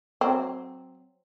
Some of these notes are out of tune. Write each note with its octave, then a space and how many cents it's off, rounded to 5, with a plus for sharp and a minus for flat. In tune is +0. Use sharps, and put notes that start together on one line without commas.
F#3 +0 C4 +0